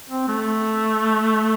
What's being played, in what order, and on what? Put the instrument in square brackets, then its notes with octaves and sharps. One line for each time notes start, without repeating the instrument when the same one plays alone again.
[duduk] C4
A3